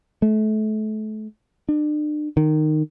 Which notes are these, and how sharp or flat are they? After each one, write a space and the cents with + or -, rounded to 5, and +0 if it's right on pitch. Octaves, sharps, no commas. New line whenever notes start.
A3 -30
D4 +40
D#3 -15